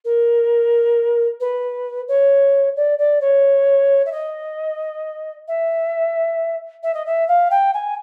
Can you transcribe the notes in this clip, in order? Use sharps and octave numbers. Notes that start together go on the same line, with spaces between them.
A#4
B4
C#5
D5
D5
C#5
E5
D#5
E5
E5
D#5
E5
F5
G5
G#5